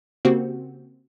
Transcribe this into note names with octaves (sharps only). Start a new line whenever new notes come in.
C#3 A#3 C4 F#4 G4